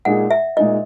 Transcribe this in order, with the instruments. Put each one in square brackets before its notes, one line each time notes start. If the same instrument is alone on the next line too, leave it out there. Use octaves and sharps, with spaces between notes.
[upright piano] A#2 G#3 D#4 G#4 [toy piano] F#5
[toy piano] E5
[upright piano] A#2 G#3 D#4 G#4 [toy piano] D#5